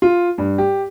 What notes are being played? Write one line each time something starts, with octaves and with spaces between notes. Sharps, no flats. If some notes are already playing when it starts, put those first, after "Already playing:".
F4
G2
G4